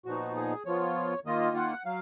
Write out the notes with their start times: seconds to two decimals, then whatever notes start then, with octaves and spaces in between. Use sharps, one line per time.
0.05 A#2 F3 B3 D#4 F#4
0.36 G#4
0.66 F3 B3 F4 C#5
1.25 D#3 A#3 F4 D#5
1.56 F#5
1.85 F#3 F5